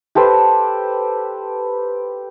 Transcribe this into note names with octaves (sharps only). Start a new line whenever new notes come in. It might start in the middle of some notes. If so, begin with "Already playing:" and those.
G4 A4 B4 C5